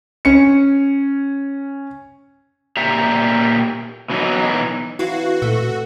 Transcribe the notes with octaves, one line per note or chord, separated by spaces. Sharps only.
C#4 C#7
A#2 G4 E5 A#5
B2 E3 F#3 D#4
E3 F#3 C4 E4 F#4 F5
A#2 A3 A4